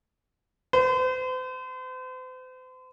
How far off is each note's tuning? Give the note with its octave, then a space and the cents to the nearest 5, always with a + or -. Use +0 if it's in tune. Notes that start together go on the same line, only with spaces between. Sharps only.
C5 -40